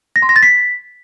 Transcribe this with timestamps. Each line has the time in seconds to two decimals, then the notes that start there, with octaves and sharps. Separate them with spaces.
0.16 A#6
0.22 C6
0.29 A#6
0.36 A6
0.43 B6